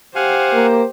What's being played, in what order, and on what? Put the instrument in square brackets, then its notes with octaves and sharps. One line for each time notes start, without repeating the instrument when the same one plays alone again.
[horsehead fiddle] G4 C5 [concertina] F5 F#5 G#5
[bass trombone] A#3